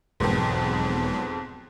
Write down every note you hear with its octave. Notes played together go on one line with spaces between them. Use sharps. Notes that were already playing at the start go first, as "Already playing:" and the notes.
E1 F2 G#2 F#3 G#3 B3